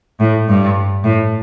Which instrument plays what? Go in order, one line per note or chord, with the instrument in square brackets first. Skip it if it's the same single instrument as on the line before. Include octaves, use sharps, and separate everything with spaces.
[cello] A2
G2
A2